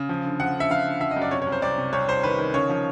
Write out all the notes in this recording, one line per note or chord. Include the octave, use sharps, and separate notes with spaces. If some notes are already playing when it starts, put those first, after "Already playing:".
Already playing: C#3
F3
D3
F3 F#5
D3
E5
F3 F5
D3
F3 E5
D#5
F#2
D5
C3 C#5
C#5
C2
C5
C2 D5
C3
C2 C#5
C2 C5
D#3 B4
D#3
C#3 C#5
F3